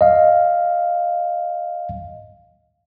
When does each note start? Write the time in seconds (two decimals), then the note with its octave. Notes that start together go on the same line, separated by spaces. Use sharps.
0.01 D#5 F5